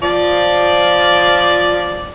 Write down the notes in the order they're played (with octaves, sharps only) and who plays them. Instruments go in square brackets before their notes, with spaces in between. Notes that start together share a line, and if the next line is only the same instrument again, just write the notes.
[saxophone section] F3 D5